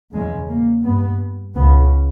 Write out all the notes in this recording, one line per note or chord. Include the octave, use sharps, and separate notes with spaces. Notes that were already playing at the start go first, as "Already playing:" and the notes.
E2 C#3 G#3
A#3
G2 B3
C#2 C#3 B3